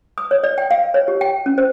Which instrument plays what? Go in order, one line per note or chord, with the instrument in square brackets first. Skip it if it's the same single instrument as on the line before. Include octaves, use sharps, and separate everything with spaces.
[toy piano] D#6
C#5
D5
G5
F5
C#5
G4
G5
C#4
C5